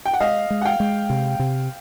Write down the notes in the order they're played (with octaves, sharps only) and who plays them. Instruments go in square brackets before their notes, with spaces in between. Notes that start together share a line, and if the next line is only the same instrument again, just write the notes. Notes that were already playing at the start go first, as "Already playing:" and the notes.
[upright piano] G5
F#5
[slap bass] G#3 [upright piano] D#5 F5
[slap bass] G#3
[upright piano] F#5
F5 G5
[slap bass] G#3
C3
C3